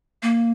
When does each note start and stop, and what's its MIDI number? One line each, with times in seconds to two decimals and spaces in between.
0.23 0.52 58